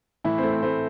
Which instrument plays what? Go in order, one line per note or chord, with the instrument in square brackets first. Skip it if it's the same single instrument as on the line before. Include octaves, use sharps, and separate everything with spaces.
[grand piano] A2 E3 E4
C4 C5
A3
C4 C5
A3 C4 C5